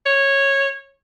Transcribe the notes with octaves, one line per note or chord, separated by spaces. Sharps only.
C#5